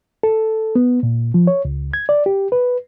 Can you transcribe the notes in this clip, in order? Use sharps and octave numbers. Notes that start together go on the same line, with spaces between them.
A4
B3
A#2
F3
C#5
C#2
G#6
D5
G4
B4